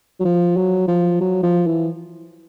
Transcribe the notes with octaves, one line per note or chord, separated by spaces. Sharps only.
F#3
F3
F#3
F3
F#3
F3
E3